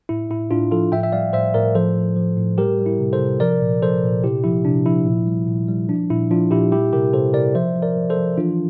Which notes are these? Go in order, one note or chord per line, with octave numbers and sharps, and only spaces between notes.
A2 E4
A2 E4
A2 D4 F4
F3 F4 A4
A2 E5 G5
E5
G3 D5 F5
A2 C5 E5
A2 A#4 D5
F3 A4 C5
A2
F3
A2
G3 G4 A#4
G3
E4
C3
A4 C5
C3
F3 A#4 D5
A#2
F3 A4 C5
A#2
C3 E4 G4
F3 E4
C3 D4
F3 E4
A#2
G3
A#2
G3
F3 D4
A#2 E4
F3 D4 F4
A#2 E4 G4
G3 E4 G4
C3 G4 A#4
C3 A4 C5
C3 A#4 D5
F3 C5 E5
F3
A#4 D5
F3
A4 C5
F3
E3 D4 F4